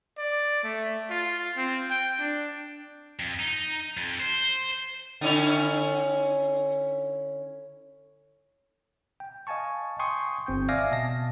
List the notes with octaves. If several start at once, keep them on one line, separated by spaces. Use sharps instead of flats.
D5
A3
F4
C4
G5
D4
F2
D#4
F2
C5
D3 C#4 E4
G5
D#5 F5 G#5 A5 C#6
G5 G#5 C6 C#6 D#6
G1 C4 G5 G6
D5 E5 F5 G#5 D6 A#6
B2 D#5 A5 A#6